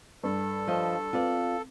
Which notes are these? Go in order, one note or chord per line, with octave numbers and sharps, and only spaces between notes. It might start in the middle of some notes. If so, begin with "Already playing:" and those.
G2 A4
F3 D#5
C4 F4 B4 D5